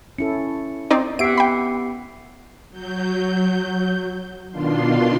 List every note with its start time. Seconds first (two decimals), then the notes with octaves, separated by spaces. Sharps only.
0.18 C#4 E4 A4 C#7
0.91 C4 D#4 D5
1.19 B3 G4 E5 F#5 C7 D7
1.38 G5 B5
2.71 F#3 G6
4.52 B2 D#3 D4 F4 C6